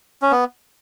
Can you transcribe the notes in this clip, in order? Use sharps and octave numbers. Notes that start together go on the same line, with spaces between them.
C#4
B3